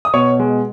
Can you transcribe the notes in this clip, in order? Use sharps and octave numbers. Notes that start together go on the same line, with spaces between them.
D#6
B2 C#5 C#6
G#3